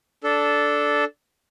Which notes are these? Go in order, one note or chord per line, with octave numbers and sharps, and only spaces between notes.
D4 A4